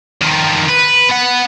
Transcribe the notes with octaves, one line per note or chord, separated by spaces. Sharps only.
D#3 F3
B4
B3 F#5